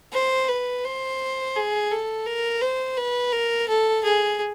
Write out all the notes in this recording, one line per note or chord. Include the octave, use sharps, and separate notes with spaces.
C5
B4
C5
G#4
A4
A#4
C5
B4
A#4
A4
G#4